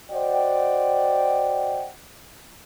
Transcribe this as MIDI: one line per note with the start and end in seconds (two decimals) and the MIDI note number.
0.11 1.88 66
0.11 1.88 72
0.11 1.88 74
0.11 1.88 75
0.11 1.88 78
0.11 1.88 79